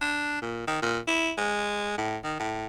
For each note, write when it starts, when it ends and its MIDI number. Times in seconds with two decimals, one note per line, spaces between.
0.01 0.39 62
0.42 0.64 46
0.67 0.80 51
0.82 0.99 46
1.08 1.32 64
1.38 1.96 56
1.98 2.17 45
2.24 2.36 51
2.40 2.67 45